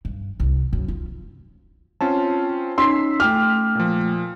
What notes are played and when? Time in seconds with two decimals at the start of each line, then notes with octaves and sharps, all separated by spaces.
0.05 G2
0.40 C2
0.73 F#2
0.88 F4
2.01 C4 C#4 F4 A5
2.78 C#4 D#4 C6 E6 B6 C7
3.20 A3 G5 D6 F6
3.75 A#2 F3